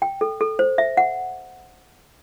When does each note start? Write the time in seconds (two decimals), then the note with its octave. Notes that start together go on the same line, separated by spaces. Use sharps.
0.02 G5
0.21 A4
0.41 A4
0.59 C5
0.78 E5
0.97 F#5